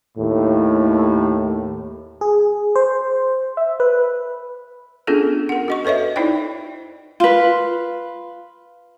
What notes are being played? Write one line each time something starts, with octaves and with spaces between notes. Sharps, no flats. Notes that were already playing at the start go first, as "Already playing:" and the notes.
D#2 A2
G#4
C5
E5
B4
B3 C#4 D4 F4 G#4 A4
A#4 F#5
F#4 D#5 C#6
A4 B4 C#5 D#5 E5
D#4 E4 C5 D5 G5
F4 B4